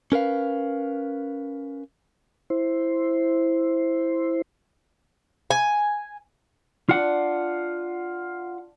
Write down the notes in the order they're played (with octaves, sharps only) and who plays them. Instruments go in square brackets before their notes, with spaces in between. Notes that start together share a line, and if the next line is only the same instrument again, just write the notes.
[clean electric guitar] C#4 A#4 B4 F5
[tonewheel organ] E4 C5
[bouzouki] G#5
[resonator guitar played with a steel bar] D4 [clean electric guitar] F4 F#5